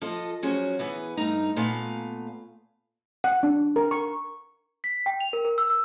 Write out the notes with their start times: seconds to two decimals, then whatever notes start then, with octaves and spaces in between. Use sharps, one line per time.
0.02 F3 A4 D#5
0.43 F3 F#3 C#4 F#4 G#4
0.79 E3 B3 G#4 B4
1.17 G2 A3 D#4 A#5
1.56 A#2 A3 B3 F5 G#5 A#5
3.24 F#5
3.43 D4
3.76 A#4
3.91 C#6
4.84 B6
5.06 G5
5.20 F7
5.33 A#4
5.45 A#4
5.58 E6
5.70 E6